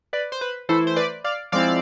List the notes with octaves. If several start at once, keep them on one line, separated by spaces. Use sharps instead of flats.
B4 D5
C5
B4
E3 A3 E4 A4 C5
C5
B4 D5
D5 F5
F3 G#3 C4 E4 D5 F5